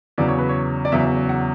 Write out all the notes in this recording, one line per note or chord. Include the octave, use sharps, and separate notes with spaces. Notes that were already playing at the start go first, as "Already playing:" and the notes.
E2 C#3 F#3 D5
C#5
B4
C#5
D5
E2 C#3 F#3 E5
F#5